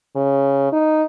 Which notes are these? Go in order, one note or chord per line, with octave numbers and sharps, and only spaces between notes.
C#3
D#4